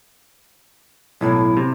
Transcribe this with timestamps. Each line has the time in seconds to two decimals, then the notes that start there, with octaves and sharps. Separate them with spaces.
1.21 B1 A2 E4
1.57 C3